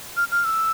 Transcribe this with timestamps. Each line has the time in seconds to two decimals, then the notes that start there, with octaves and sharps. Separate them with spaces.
0.17 F6
0.31 F6
0.45 E6